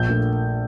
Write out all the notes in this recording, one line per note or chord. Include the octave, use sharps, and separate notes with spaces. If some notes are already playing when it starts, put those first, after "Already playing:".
Already playing: A#1 G6
A#2 A3 D4